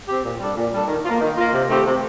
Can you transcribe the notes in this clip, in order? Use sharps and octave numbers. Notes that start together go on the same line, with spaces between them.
C4 G4
A#2
G3 D4 A4
A#2
G3 D4 A4
D#3
F4
A#3
D#3
A#3 F4
C3
D#3 A3 C4 G4
C3